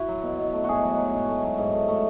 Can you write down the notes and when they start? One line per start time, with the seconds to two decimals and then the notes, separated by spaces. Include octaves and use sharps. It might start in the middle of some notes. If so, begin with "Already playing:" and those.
Already playing: E4 F#4
0.09 F#3
0.23 B2
0.38 B2
0.53 A3
0.64 G#2 F#4 G#4
0.83 F#3
0.98 F#3
1.14 G#2
1.28 A3
1.44 F#3
1.58 G#2
1.73 A3
1.88 A3